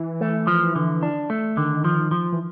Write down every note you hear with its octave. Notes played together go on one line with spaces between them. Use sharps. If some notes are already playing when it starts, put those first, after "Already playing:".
Already playing: E3
A3
F3
D3
D4
A3
D3 D#3
F3
F3
E3